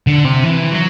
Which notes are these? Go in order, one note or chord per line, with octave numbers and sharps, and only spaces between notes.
D3
C3
E3
F#3